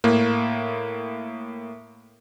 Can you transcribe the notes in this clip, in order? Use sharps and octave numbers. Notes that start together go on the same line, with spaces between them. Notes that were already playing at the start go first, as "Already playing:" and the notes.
A2 A#3